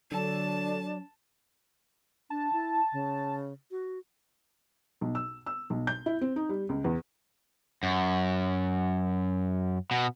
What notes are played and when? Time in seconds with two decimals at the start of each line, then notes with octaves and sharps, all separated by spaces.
0.12 D3 F#3 D4 A4 A5
2.30 D4 A5
2.53 E4
2.93 C#3
3.71 F#4
5.01 B1
5.15 E6
5.46 E6
5.70 B1
5.87 G6
6.06 E4
6.21 C4
6.36 D#4
6.49 G3
6.69 C#2
6.84 E2
7.83 F#2
9.91 B2